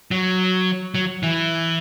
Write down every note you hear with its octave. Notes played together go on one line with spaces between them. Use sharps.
F#3
F#3
E3